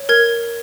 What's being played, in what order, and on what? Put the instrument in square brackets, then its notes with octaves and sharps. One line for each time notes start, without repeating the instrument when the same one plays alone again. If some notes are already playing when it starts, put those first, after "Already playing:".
Already playing: [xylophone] C#5
A#4 G#6